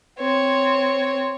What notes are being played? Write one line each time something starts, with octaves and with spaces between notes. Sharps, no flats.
C4 C#5